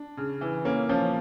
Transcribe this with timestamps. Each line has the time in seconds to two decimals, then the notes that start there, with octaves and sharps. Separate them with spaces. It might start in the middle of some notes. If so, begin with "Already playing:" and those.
Already playing: D4
0.17 C#3
0.41 E3
0.65 A#3 C#4
0.89 F3 C#4